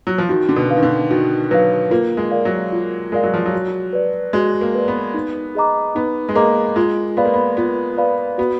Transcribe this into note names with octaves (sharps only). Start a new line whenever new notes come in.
F#3
F3
D#3 F#4
D3
B2
B4 F5
D#3
D3
D#3 F#4
F#3 B4 F5
A#3 F4
G#3
A#4 D5 F5
F#3
F4
G#3 A#4 D5 F5
F#3
F3
F#3
F#4
B4 D5
G#3 F#4
A#3
B4 D5
B3
D#4
G#4 D#5 A#5 D6
B3 D#4
G#3
A#3 G#4 D#5 A#5 D6
G#3 F4
B3 B4 D5 F5 B5
A#3
B3
B3 F4
B4 D5 F5 B5
B3 F#4